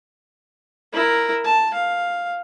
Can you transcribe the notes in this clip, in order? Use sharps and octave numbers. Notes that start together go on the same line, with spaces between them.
E4 A#4
A5
F5